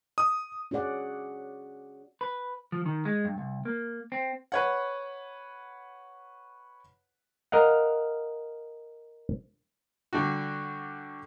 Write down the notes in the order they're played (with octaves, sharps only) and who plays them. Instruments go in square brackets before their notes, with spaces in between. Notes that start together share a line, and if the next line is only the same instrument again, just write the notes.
[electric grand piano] D#6
[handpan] C#4 F#4 G#4 D5 F#5
[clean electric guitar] B4
F3
D#3
G#3
G2
C2
A#3
C4
[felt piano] B4 C#5 F#5
[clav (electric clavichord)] A#4 D#5 F5 F#5
[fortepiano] D3 G3 D4 F#4